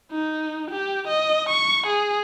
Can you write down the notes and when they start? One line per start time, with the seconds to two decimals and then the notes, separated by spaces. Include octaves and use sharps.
0.11 D#4
0.71 G4
1.08 D#5
1.49 C#6
1.87 G#4